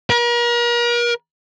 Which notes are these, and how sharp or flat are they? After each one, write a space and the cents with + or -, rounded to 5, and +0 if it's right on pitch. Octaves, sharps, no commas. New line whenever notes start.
A#4 +40